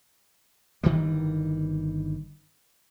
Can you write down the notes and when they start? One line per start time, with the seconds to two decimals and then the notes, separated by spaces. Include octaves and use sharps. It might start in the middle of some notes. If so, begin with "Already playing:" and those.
0.83 G1 D#3 E3 G3